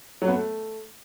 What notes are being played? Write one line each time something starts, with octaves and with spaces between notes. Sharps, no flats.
F#3
B3
A3